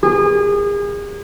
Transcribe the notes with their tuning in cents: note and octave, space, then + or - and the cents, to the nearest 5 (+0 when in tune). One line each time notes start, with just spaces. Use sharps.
G#4 -35